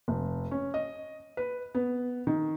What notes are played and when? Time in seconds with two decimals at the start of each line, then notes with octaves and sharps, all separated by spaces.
0.08 F1
0.51 C#4
0.74 D#5
1.37 B4
1.75 B3
2.27 D#3